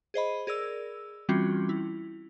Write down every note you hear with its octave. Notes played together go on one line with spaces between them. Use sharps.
G#4 C5 D#5 B5
G#4 A#4 D5 E6
E3 G3 C4 C#4 F4 F#4
E4